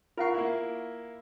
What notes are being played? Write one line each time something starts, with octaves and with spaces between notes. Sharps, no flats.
F4 A#4 F5 F#5 C#6
A#3 E4